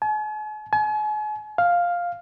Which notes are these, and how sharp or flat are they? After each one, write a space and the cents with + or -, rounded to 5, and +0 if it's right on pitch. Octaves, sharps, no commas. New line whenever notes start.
G#5 +45
G#5 +40
F5 +5